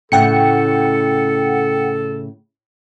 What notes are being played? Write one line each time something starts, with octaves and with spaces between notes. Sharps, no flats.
A2 C#3 A4 F#5 G5 C#7